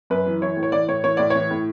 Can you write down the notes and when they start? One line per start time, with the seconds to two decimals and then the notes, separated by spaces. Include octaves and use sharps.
0.10 F#2 B4
0.26 E3
0.42 E3 C#5
0.57 A2
0.63 C#5
0.72 E3 D5
0.88 A2 C#5
1.04 E3 C#5
1.17 A2 D5
1.30 E3 C#5
1.51 A2